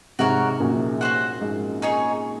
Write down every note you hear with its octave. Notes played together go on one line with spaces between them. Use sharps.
G#2 C3 F#4 A#4 C#5
F#2 A#2
F#4 C5 F#5
G#2
D#4 G#4 C#5